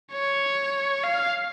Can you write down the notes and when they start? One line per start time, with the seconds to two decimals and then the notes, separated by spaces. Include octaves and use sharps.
0.12 C#5
1.04 F5